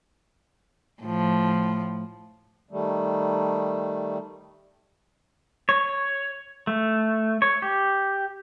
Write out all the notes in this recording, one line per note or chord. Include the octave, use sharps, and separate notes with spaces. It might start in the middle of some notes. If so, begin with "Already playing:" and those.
A2 F3
D#3 G3 A3
C#5
A3
C#5
G4